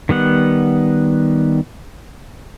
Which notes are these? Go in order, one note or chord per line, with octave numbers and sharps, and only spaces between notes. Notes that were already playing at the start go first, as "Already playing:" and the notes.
D#3 G3 B3 F#5